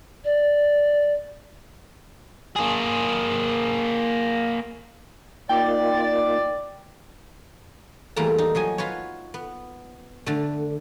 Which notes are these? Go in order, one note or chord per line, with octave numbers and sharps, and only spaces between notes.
D5
A#3 G#4
A#3 D#4 F4 D5 G5
E2 G3 A3 A#3 A5 A#5
D#4
F3 F#3 D#5 G#5
F4 F#4 B4 C#5
B3
D3 A3